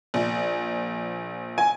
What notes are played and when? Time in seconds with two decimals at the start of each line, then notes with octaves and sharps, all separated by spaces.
0.14 A#1
1.58 G#5